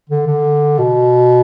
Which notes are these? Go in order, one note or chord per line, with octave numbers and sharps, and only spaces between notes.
D3
D3
B2